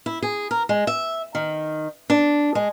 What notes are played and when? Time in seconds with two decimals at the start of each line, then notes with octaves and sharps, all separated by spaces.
0.06 E4
0.22 G#4
0.51 A#4
0.69 G#3
0.87 E5
1.35 D#3
2.10 D4
2.55 G#3